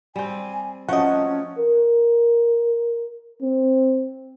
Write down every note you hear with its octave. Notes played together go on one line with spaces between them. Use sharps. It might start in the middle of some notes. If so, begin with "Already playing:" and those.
G3 C4 G#5
F3 F#3 A3 C#4 D#5 F#5
A#4
C4